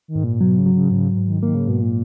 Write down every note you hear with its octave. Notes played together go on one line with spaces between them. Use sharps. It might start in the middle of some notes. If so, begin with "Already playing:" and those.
D#3
G#2
A#2
B2 F#3
C#3
F#3
C#3
G#2 C#3
G#2
D#3
D#3 A#3
C#3
G#2 B2
A#2